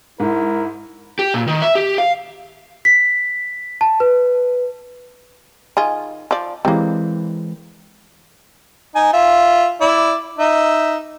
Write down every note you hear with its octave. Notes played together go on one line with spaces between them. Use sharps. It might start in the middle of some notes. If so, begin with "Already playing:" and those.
G#2 E4 A#4
G4
A#2
D#3
E5
G4
F5
B6
A5
B4
D#3 F4 G#4
F3 D5
E3 G3 G#3 A#3 C4
D#4 G#5
F4 E5
E4 D5
D#4 E5